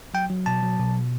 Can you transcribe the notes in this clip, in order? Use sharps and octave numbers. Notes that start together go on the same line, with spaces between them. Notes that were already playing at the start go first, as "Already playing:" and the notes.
F#3 G5
F#3
B2 A5
F#3
B2